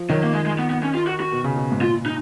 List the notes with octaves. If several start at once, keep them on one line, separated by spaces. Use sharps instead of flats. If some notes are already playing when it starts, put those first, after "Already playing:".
Already playing: F3
D#3 F#3
A#3
G#3
G#3
B3
B3
C#4
F4
F#4
F#4
B2
C#3
B2
G#2
A#2 F4
D#4